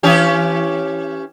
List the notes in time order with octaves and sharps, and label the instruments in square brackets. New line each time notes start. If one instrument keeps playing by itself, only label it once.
[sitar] E3 C#4 G4